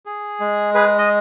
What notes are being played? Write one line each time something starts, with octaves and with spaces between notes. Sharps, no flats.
G#4
G#3
G#4 B4
D#5